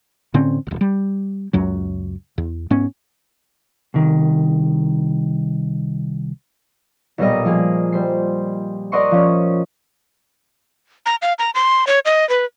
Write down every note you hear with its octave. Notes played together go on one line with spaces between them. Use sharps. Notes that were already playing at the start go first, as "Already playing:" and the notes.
A2 D3 C4 C#4
D#1 G#1
G3
C#2 F#2 F#3
E2
G#2 B3 C#4
C2 D#3
B1 A#2 G3 A#4 D#5
F3 A#3 G#4
G3 C5 C7
A#4 D5 D#5 F#5 C6 C#6
F3 C#4
A#5
F5
A#5
C6
C#5
D#5
B4